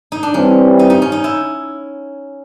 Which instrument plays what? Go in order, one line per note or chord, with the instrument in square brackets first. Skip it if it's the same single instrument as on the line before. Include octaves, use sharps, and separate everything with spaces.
[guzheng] D#4
D4
[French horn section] E3 G3 C4 [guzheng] C#4
[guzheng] D#4
D#4
C#4
D#4
E4